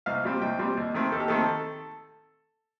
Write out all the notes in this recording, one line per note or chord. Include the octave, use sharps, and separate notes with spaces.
C2 F5
A#2 G3 C4
C2 G5
A#2 G3 C4
D#2
D#3 A3 C4
D#2 A4
G4
D#3 A3 C4 A4